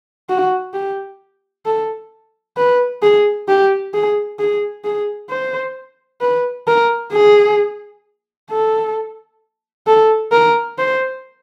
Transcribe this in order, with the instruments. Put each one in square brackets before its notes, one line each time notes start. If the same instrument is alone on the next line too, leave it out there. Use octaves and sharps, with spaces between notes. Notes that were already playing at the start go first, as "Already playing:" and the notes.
[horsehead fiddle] F#4
G4
A4
B4
G#4
G4
G#4
G#4
G#4
C5
B4
A#4
G#4
A4
A4
A#4
C5